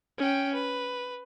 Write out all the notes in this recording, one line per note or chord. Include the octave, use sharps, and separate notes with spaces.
C#4 G5
B4